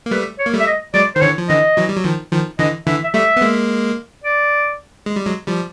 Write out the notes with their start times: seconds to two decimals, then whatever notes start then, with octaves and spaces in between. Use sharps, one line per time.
0.06 A#3
0.11 G3 A3 B4
0.39 C#5
0.46 A#3
0.53 G3 A3
0.60 E5
0.67 D#5
0.94 F#3 G#3 D5
1.15 D#3 C5
1.22 D3 E3 C#5
1.38 F3
1.49 D3 E3 D#5
1.77 E3 F#3
1.89 G3
1.97 F#3
2.04 D#3 F3
2.31 D#3 F3
2.59 D3 E3 D#5
2.87 D3 E3 E5
3.04 E5
3.14 G3 A3 E5
3.36 B3
3.41 G#3 A#3
4.24 D5
5.06 G#3
5.16 G3
5.26 F#3 G#3
5.48 F3 G3